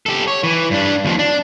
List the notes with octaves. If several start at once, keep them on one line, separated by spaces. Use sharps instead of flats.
G4 A4
C#5
E3
G2 D4
D#2 F3
D4